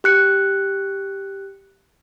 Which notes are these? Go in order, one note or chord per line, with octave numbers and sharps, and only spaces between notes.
G4 F#6 C#7